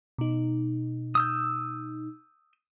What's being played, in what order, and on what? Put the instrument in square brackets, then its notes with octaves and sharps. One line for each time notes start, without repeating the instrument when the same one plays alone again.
[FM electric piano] B2 D#4
[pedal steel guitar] D#6 E6 G6